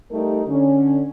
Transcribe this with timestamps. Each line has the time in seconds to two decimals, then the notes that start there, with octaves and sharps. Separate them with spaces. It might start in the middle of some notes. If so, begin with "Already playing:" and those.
0.12 G3 A3 D#4 A#4
0.48 D3 C#4